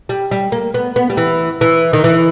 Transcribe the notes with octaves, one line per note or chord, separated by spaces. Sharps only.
G3
G3
A#3
B3
B3
G3
E3
E3
D#3
E3